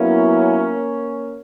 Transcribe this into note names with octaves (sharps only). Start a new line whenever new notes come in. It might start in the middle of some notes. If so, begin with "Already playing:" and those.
Already playing: F#3 A#3 B3 C#4 E4